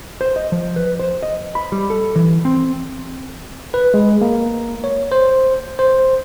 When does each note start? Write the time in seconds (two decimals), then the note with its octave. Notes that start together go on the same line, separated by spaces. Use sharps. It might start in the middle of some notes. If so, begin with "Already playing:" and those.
0.21 C5
0.36 D#5
0.52 F3
0.76 B4
1.00 C5
1.23 D#5
1.55 B5
1.72 G3
1.90 A4
2.16 E3
2.45 C4
3.74 B4
3.94 G#3
4.21 A#3
4.84 C#5
5.12 C5
5.79 C5